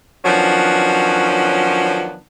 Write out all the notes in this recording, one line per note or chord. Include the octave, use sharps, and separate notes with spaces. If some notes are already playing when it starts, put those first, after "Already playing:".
D#3 F3 F#3 B3 C#4 D4